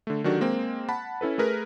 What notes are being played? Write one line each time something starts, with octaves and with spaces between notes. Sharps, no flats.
D3 A3
D#3 F#3 D4 F#4 G4 A4
G#3 A#3 C4
F#5 A5 B5
C#4 E4 A4 B4
A3 G#4 A#4 B4